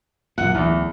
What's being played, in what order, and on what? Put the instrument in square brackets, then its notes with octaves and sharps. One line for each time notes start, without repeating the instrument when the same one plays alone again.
[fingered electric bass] F1 B1 A#2 [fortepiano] F#5
[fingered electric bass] D1 [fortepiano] E2